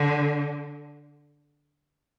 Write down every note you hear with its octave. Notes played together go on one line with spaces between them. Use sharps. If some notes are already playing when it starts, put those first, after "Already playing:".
Already playing: D3